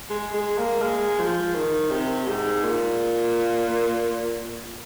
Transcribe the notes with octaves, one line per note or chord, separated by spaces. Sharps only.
G#3
G#3
A#3
G#3
F3
D#3
C3
G#2
A#2